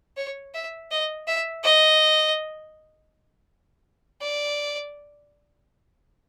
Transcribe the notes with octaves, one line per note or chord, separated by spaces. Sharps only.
C#5
E5
D#5
E5
D#5
D5